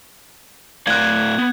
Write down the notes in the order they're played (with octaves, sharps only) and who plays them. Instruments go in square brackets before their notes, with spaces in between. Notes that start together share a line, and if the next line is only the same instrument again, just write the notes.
[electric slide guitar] A2 D5 F5 [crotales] F#6 G#6
[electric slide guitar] B3